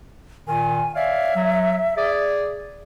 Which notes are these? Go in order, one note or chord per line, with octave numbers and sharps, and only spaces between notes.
A#2 D#3 G#5
C#5 D5 E5 F5
F#3
G#4 D5